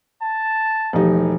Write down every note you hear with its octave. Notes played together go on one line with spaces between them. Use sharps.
A5
E1 F3 A3 D#4 G4